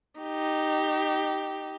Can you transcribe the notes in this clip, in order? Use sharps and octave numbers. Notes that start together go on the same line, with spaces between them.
D#4 G4